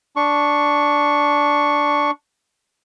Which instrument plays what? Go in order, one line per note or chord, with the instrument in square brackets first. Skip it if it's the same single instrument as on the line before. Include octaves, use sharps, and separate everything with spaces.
[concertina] D4 C#6